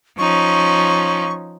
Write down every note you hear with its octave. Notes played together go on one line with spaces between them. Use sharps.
F3 C#4 D#4 C#6